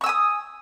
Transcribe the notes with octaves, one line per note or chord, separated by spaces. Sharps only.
G#5 C#6 D#6 E6